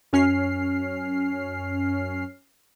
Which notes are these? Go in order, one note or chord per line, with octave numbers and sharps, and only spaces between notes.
F#2 C#4 F6 C7